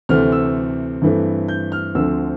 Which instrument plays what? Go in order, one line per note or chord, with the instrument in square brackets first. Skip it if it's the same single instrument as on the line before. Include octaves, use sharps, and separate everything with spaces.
[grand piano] D2 C3 E3 A3 C4 F6
E6
G2 E3 A3 C4
G6
F6
D2 D3 F3 C4 E6